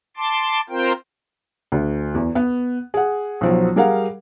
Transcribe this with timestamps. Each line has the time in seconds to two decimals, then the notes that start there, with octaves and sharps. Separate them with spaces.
0.17 A5 C6 D6
0.70 C4 F4 A#4 C5 G5
1.72 D2
2.14 E2
2.35 B3
2.94 G#4 F#5
3.41 B1 F3 F#3
3.76 G3 G#4 A#4 F5 F#5